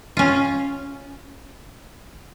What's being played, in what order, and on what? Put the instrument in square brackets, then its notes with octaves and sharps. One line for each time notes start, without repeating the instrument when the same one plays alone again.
[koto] C#4 F4